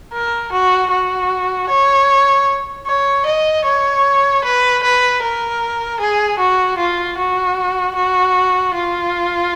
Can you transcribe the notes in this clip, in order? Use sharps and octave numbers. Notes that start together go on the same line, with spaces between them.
A#4
F#4
F#4
C#5
C#5
D#5
C#5
B4
B4
A#4
G#4
F#4
F4
F#4
F#4
F4